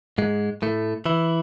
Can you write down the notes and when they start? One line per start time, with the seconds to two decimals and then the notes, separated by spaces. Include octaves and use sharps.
0.18 G#2 G#3
0.62 A2 A3
1.06 E3 E4